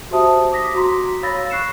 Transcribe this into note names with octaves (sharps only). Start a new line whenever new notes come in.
F#4 G4 C5 E5 A5 D#6
D6 D#6 A#6 B6
F#4 A#5 C6 B6
C#5 F5 B5 E6 A6 A#6
C#6 F#6 C7 C#7 E7